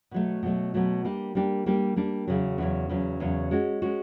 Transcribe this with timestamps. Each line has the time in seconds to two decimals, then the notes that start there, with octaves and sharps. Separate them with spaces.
0.11 B2 F#3 A3
0.43 B2 F#3 A3
0.74 B2 F#3 A3
1.05 G3 A#3 D4 G4
1.35 G3 A#3 D4 G4
1.66 G3 A#3 D4 G4
1.96 G3 A#3 D4 G4
2.27 E2 C#3 F#3
2.58 E2 C#3 F#3
2.89 E2 C#3 F#3
3.20 E2 C#3 F#3
3.51 G#3 C#4 F#4
3.82 G#3 C#4 F#4